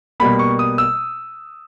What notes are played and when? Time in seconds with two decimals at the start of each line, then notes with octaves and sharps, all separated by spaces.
0.20 B2 G3 A#3 B5
0.39 C#6
0.59 D#6
0.78 E6